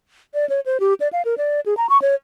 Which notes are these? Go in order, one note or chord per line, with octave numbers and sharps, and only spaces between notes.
D5
C#5
C5
G4
D5
F5
A#4
D5
G#4
A#5
C#6
C#5